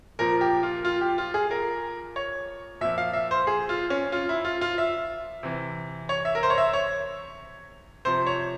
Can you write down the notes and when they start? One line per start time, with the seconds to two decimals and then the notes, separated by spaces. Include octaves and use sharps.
0.19 A#2 F3 A#4
0.41 G4
0.63 F4
0.85 F4
1.01 G4
1.18 F4
1.34 G#4
1.51 A#4
2.16 C#5
2.81 A#2 F3 E5
2.98 F5
3.13 E5
3.31 C5
3.47 G#4
3.69 F4
3.90 C#4
4.12 F4
4.29 E4
4.45 F4
4.61 F4
4.78 E5
5.43 C3 E3
6.09 C#5
6.25 E5
6.35 A#4
6.43 C5
6.50 C#5
6.58 E5
6.73 C#5
8.05 C3 F3 C5
8.27 C#5